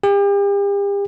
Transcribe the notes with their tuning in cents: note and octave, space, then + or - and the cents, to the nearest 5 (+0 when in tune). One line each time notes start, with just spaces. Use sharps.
G4 +40